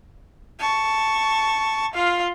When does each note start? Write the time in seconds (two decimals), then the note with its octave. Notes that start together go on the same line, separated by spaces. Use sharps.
0.59 A5 C#6
1.93 F4 F5